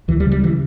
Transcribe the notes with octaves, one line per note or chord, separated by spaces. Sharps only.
D2 E3
G3
C#3
G3
E3